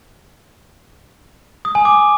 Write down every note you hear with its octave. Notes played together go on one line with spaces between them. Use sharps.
D#6
G#5
D6